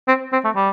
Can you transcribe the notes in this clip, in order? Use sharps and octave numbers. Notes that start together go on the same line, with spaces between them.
C4
C4
A3
G3